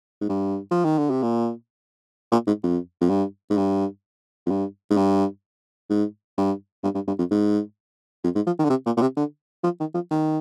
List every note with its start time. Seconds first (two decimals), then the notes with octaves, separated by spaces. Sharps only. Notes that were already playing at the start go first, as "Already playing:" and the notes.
0.21 G#2
0.29 G2
0.72 F3
0.85 D#3
0.98 D3
1.11 C3
1.23 A#2
2.32 A#2
2.47 G#2
2.64 F2
3.01 F2
3.10 G2
3.50 G#2
3.57 G2
4.46 F2
4.51 G2
4.91 G#2
4.97 G2
5.90 G#2
6.38 G2
6.84 G2
6.95 G2
7.07 G2
7.19 F2
7.31 G#2
8.24 F2
8.36 G#2
8.47 F3
8.59 D#3
8.65 D3
8.70 C3
8.86 A#2
8.97 A#2
9.02 C3
9.17 D3
9.64 F3
9.80 D#3
9.95 F3
10.11 D#3